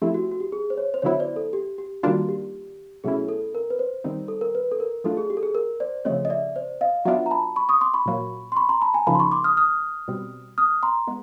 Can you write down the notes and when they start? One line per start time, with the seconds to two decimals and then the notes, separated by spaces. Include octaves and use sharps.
0.02 F3 A3 C4 E4 G4
0.14 F#4
0.31 F#4
0.40 G4
0.52 G#4
0.70 C5
0.78 C#5
0.94 C5
1.02 D3 F#3 B3 E4 C#5
1.19 C5 D5
1.36 A4
1.53 G4
1.78 G4
2.03 D#3 G3 A#3 D4 F4 F#4
2.29 G4
3.04 B2 F#3 A3 C#4 E4 G#4
3.29 A4
3.55 A#4
3.70 B4
3.79 C5
4.04 D#3 G3 C4 D#4
4.28 A4
4.41 A#4
4.55 B4
4.72 A4
4.80 A#4
5.04 F#3 A3 D4 F4 A4
5.17 G#4
5.30 G4
5.37 A4
5.43 G#4
5.55 A#4
5.80 C5 D5
6.05 C#3 F3 A3 C4 C#5 D#5
6.25 D#5
6.30 D5 E5
6.56 C5 D5
6.81 D#5 F5
7.05 F#3 B3 D4 F4 E5 F#5
7.26 A#5
7.31 A5 B5
7.56 B5 C#6
7.69 C#6 D#6
7.81 C6 D6
7.94 B5 C#6
8.06 A#2 F#3 A#3
8.52 C6
8.57 B5 C#6
8.69 A#5 C6
8.82 A5 B5
8.94 G#5 A#5
9.07 C#3 F3 A#3 D#4 A5 B5
9.15 C6
9.20 B5 C#6
9.32 C6 D6
9.44 D#6 F6
9.57 D#6 F6
10.08 B2 G3 C4
10.58 D#6 F6
10.83 A#5 C6
11.07 G#3 B3